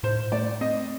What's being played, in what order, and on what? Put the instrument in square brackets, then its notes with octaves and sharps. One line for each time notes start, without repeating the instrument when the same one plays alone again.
[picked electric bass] A2 [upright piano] C5
[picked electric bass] A3 [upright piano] D5
[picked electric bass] C4 [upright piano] D#5